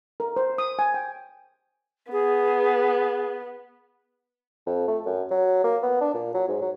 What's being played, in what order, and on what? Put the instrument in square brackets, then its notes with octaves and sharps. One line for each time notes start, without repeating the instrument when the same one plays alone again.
[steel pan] A#4
C5
D#6
G#5
G5
[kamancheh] B3 [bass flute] G#4
[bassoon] F2
A3
F#2
F#3
A#3
B3
D4
A#2
F#3
G#2
F#3